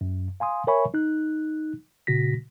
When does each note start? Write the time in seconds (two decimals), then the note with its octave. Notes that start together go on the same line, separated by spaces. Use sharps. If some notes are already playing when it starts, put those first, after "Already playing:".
0.01 F#2
0.40 F5 G#5 C6 D#6
0.67 A#4 C#5 E5 G#5 B5 C#6
0.94 D#4 F#6
2.07 A#2 C#3 F#4 A#6 B6